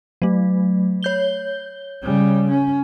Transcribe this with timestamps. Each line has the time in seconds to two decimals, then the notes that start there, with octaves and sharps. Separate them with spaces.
0.22 F#3 A3
1.03 C#5 G6 G7
2.03 C#3 G3
2.51 C#4